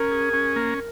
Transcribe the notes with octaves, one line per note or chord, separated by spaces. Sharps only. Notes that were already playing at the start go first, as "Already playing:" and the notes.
Already playing: C#4 A#4
G#4
C#4
A#3